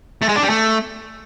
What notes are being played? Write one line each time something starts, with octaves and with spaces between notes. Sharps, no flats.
A3
G#3
D4
G3
A3